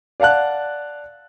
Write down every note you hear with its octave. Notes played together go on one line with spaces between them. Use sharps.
D5 F5 F#5 A5 F#6